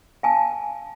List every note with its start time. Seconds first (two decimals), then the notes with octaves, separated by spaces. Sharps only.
0.23 F5 G#5 A5